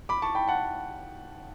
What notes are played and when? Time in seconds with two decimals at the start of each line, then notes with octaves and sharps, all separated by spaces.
0.09 B5 D6
0.22 A5 C#6
0.35 G5 B5
0.48 F#5 A5